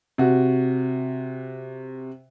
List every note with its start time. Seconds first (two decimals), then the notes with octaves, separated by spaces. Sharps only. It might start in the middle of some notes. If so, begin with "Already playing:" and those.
0.18 C3 F#4